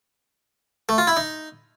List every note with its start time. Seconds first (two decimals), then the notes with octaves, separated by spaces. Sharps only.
0.89 A3
0.98 F4
1.07 E4
1.17 D#4